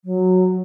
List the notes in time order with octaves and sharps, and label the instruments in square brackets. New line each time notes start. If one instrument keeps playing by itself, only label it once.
[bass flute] F#3